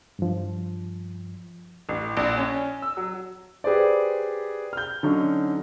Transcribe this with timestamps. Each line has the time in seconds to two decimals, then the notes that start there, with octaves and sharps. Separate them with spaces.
0.19 G2 F3
1.89 A1
2.17 A#1
2.38 C#4
2.82 E6
2.97 F#3
3.64 G4 G#4 B4 C5 D5
4.73 F6 G6
5.03 D3 F#3 C#4 D#4